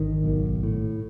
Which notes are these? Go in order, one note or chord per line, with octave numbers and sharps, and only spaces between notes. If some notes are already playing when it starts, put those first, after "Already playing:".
Already playing: G#1 D#3
B1
A2